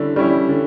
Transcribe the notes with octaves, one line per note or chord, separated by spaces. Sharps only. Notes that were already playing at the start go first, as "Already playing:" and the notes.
Already playing: D3 G3 C#4 E4
G3 C#4 E4
D3